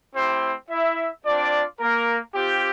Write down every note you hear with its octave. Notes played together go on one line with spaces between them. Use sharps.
A3 C4 E4 G4 C5
E4 E5
C4 D4 F4 D5
A#3 A#4
C4 F4 G4